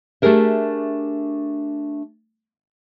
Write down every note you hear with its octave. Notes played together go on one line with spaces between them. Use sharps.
A3 D4 G4 G#4 A#4 E5